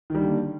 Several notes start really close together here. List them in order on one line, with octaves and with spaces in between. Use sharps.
D#3 G3 D3 A#3